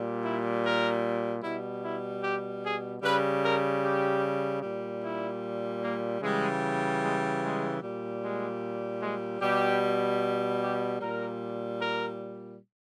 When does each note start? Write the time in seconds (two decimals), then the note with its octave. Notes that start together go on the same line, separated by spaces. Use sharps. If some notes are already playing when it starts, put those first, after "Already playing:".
Already playing: A#2 G3
0.23 E4
0.62 A#4
1.42 B2 G3 E4
1.83 E4
2.22 G4
2.62 G#4
3.02 C#3 G3 B4
3.42 A#4
3.82 G4
4.62 A#2 G3
5.02 E4
5.81 A#3
6.21 C#3 E3 G3 G#3
7.01 G#3
7.41 G#3
7.81 A#2 G3
8.21 G#3
9.00 G#3
9.40 B2 G3 G4
10.61 G4
10.99 A#2 G3 A#4
11.80 A#4